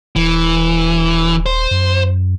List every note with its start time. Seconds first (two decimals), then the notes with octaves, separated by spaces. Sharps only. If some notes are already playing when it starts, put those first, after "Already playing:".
0.16 D#1 E3
1.46 C5
1.71 F#2